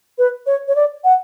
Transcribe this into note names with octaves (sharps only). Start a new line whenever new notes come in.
B4
C#5
C#5
D5
F#5